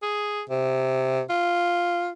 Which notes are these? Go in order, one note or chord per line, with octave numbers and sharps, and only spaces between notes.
G#4
C3
F4